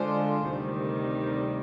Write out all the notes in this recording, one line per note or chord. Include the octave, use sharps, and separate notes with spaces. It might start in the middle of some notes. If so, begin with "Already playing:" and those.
Already playing: D3 G#3 D4 F4 C5
D2 C3 D#3 G3